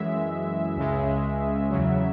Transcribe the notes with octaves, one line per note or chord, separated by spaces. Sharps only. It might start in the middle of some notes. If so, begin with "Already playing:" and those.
Already playing: F#2 E3 G#3 E5
C#2 C#3 G#3
E2 C#3 F#3